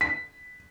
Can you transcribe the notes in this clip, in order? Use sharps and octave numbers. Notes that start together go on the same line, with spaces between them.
B6